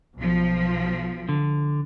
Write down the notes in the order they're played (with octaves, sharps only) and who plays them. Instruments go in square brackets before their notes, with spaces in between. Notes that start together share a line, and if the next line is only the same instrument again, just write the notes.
[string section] B1 F3
[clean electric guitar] D3